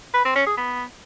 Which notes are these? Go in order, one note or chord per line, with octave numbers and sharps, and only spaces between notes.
B4
C4
C#4
G#4
B3